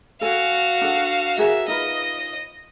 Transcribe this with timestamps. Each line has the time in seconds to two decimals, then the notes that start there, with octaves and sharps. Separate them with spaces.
0.21 F#4 A4 F5 G#5
0.81 D4 A4 F#5
1.38 F#4 G#4 A#4 E5
1.68 D#4 F4 B4 D#5